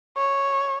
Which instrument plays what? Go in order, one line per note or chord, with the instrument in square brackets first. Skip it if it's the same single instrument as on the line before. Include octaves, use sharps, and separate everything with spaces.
[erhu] C#5